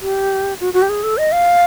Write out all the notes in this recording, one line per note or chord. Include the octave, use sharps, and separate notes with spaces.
G4
F#4
F#4
G4
G#4
A4
D#5
F5